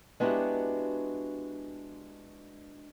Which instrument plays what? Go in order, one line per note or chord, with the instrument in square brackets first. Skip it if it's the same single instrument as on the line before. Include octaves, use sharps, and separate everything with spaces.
[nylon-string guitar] G#3 B3 D4 E4 F#4 G4